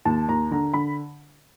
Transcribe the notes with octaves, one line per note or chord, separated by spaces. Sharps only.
D#2 A5
D#2 A#5
D3 A#5
D3 B5